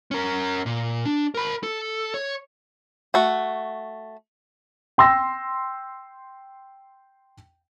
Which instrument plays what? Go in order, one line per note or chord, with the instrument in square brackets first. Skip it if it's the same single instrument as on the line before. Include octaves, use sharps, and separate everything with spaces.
[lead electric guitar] C#4 A#4
A#2
D4
A#4 B5
A4
C#5
[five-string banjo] A3 F#4
[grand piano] G5 C6 E6 A#6